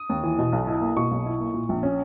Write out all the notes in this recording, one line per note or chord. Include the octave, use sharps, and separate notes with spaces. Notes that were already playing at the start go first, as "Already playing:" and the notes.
Already playing: D#6
D#2
E3
B2
B1
E4
A#3
B2 C#6
B1
E4
A#3
A#2
A#1
C#4